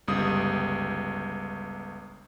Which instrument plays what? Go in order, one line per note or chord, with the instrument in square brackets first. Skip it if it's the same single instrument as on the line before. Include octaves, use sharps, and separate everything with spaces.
[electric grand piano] G1 C#2 G3 D#6